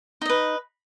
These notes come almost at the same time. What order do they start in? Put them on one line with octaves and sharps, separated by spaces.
D#4 D#5 B4